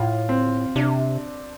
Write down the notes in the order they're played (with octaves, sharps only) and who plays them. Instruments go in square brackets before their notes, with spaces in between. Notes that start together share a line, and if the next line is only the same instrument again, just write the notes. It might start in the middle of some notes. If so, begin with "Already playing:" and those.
Already playing: [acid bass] A2 [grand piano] F4
[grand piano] C4
[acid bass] C3 [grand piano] D4